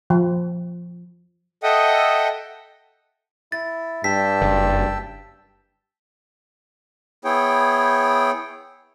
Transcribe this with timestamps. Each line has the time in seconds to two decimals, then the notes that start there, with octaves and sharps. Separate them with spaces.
0.10 F3
1.63 A4 D#5 E5 F#5 G5 D#6
3.52 E4 A6
4.04 G2 G5 A5 E6 B6
4.41 F#1
7.25 B3 E4 G#4 C#5 G5